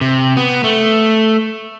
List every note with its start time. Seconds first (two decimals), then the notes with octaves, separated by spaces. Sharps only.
0.01 C3
0.37 B3
0.64 A3